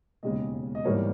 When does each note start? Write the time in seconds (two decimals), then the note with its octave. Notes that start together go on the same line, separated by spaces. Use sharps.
0.23 E1 D#2 C#3 G#3 D#5
0.75 D#5
0.84 G#1 G#2 E3 G3 A#3 C#5